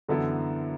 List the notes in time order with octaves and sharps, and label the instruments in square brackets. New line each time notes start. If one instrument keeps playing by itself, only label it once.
[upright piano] F#2 E3 B3 E4 A4 [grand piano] D3